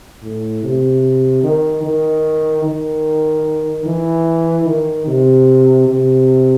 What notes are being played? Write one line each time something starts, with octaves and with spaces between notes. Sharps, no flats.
A2
C3
D#3
D#3
D#3
E3
D#3
C3
C3